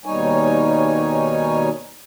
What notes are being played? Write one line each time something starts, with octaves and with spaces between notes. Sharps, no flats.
D#2 B2 G3 D#4 C#5 G#5